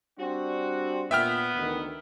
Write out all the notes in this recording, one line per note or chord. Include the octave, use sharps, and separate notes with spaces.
G3 C4 D4 F#4
A#2 B3 E5 G5 F6
D2 D#3